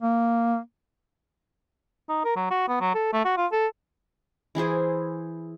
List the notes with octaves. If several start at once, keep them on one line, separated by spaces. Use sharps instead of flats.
A#3
D#4
A#4
F#3
F#4
B3
F#3
A4
A3
F#4
F4
A4
E3 E4 G#4 C5